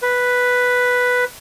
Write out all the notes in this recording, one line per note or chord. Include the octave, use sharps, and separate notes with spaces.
B4